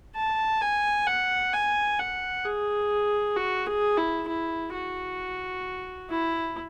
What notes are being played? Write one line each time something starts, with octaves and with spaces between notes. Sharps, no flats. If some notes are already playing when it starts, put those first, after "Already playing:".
A5
G#5
F#5
G#5
F#5
G#4
F#4
G#4
E4
E4
F#4
E4